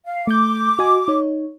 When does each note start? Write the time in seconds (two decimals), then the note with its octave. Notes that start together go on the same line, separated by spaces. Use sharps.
0.05 F5
0.27 A3 D6 G6
0.79 F#4 D#5 G#5
1.08 D#4 C#5